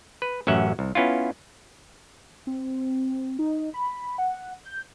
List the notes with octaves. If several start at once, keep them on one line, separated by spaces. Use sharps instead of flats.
B4
A1 F#2 C#4 E5 F#5
C2
B3 C#4 E4 F4
C4
D#4
B5
F#5
G6